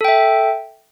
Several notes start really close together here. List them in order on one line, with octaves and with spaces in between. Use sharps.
A4 G5 E5